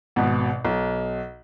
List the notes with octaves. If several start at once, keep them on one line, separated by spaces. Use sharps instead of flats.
G#1 B2
B1